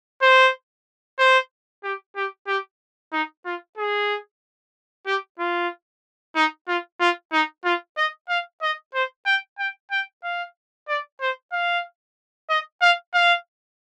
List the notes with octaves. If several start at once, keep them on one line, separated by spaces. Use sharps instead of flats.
C5
C5
G4
G4
G4
D#4
F4
G#4
G4
F4
D#4
F4
F4
D#4
F4
D#5
F5
D#5
C5
G5
G5
G5
F5
D5
C5
F5
D#5
F5
F5